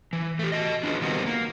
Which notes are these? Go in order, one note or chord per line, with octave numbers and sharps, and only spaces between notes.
E3
A3 G4
F#4 D#5
D4 F4 G4 G#4 B4
D#3 G3 B3 C4 F#4 A#4
A#3